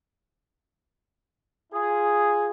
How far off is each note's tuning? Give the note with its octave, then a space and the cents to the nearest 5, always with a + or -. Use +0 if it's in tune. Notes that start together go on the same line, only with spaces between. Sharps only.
F4 +0 G#4 +0